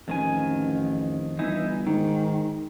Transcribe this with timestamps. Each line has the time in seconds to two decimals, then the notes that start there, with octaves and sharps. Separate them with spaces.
0.08 A1 F2 D#3 G#5
1.39 G1 E3 D#4 E4
1.87 G#2 D#3